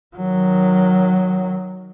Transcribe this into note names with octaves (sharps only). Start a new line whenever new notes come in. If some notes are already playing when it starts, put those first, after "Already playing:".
D#3 F#3